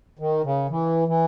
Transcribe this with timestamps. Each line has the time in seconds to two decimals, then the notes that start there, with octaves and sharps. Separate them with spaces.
0.19 D#3
0.44 C#3
0.70 E3
1.08 E3